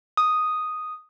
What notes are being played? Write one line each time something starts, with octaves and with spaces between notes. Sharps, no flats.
D#6